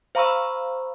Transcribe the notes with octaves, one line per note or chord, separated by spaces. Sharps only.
C5 F5 A#5 B5 C#6 E6